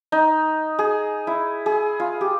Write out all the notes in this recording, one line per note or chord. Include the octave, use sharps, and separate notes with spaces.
D#4
G#4
E4
G#4
F4
G4